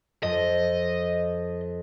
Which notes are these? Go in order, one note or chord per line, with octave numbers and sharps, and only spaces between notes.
F2 D#5